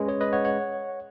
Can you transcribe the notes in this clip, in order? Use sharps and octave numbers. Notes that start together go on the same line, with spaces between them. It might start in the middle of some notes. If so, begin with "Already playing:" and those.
Already playing: G#3 C#4 B4 D#5
G#4 C#5
B4 D#5
C#5 F#5
C#5 F#5